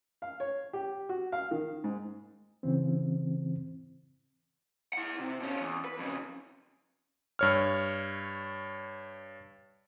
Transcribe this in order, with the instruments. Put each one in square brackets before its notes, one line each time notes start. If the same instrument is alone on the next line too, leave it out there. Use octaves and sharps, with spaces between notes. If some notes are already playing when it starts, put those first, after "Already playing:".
[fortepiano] F5
C#5
G4
F#4
F5
D#3
G#2
[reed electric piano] C#3 E3 C4
[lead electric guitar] E4 F#5
C3
B2 C#4
E2
B4
F2 C#3
[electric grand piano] G2 C#5 F6